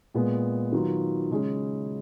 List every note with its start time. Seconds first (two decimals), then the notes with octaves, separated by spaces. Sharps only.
0.14 A#2 G#3 B3
0.72 D#3 F#3 B3 F4
1.31 C#3 G#3 C#4 G#4